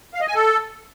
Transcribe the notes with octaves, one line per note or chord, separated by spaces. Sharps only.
F5
D#5
G#5
A4